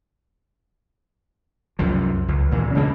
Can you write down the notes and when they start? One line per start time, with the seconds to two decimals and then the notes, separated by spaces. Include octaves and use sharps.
1.79 C2 F#2 F3
2.28 C#2
2.51 D#2 A#2 E3
2.75 C#3 G#3 A#3 D4